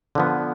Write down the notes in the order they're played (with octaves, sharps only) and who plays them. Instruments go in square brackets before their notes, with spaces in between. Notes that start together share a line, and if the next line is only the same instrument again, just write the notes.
[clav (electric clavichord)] D3 F3 B3